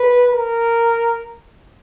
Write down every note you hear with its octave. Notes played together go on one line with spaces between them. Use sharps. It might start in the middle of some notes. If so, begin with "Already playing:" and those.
Already playing: B4
A#4